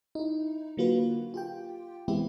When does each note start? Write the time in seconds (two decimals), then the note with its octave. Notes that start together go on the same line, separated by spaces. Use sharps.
0.15 D#4 E4
0.77 D3 F#3 A#3 F4 F#4 B4
1.34 F4 G4 G5
2.08 E3 G#3 B3 C4 E4 G4